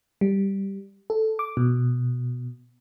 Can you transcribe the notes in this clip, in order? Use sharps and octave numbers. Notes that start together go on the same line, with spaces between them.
G3
A4
D6
B2